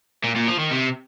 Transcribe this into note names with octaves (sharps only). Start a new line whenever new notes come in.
A#2
A#2
F3
D#3
C3